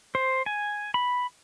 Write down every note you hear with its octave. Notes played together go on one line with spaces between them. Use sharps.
C5
G#5
B5